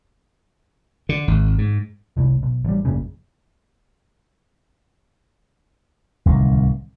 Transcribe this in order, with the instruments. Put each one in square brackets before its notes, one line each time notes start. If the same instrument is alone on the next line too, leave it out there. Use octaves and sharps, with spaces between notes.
[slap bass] D3
G#1
G#2
[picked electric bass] F1 C2 A2
B1
A1 G3
A1 F#2 A#2 C#3
[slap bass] D1 C2 D#3